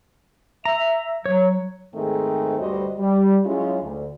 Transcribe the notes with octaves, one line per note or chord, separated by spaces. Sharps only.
E5 A#5
F#3 C#5
G#2 D#3 G#3 A3 C4 G#4
D2 G2 G3 F#4 C5 D#5
G3
F#3 G#3 C#4 E4 F4 G#4
D2